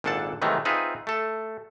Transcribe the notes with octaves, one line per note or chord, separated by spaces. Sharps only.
G#1 A#2 D4 A4 F#5 A5
C3 D#3 E3 F#3 G#3 A3
C4 D#4 F4 G#4 B4 E5
A3 A4